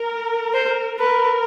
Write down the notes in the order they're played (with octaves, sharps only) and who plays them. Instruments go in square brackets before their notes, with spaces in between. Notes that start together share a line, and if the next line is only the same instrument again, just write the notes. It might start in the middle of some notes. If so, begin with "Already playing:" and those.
Already playing: [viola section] A#4
[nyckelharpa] C5
[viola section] A#4 [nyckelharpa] B4